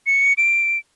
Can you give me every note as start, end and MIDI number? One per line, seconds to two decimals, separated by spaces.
0.07 0.33 97
0.37 0.78 98